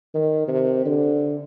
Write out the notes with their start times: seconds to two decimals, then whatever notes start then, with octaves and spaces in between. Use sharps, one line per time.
0.14 D#3
0.48 C3
0.86 D3